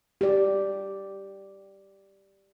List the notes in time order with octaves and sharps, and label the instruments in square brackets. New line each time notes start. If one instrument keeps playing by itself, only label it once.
[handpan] G4 D5